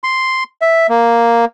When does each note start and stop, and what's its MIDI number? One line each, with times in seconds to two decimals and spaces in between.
0.04 0.44 84
0.62 0.87 76
0.89 1.45 58